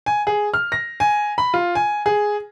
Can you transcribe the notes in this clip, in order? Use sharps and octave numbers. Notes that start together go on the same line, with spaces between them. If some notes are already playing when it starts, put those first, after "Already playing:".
G#5
G#4
F6
A#6
G#5
B5
F4
G#5
G#4